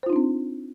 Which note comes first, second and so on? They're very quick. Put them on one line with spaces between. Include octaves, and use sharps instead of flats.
C5 F4 D#4 D4 C4